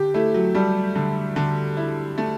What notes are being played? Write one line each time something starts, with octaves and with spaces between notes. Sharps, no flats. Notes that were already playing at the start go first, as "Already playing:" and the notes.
Already playing: D3 G4
A3 E4
F#3
G3 A3
D3
D3
E4
A3